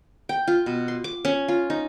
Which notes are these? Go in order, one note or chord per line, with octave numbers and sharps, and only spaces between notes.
G5
F4
B2
C6
D6
C#4
F4
D#4